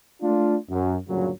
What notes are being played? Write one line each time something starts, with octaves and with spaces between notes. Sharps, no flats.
A3 D4 F4
F#2
D2 G2 A#2 C#3 F#3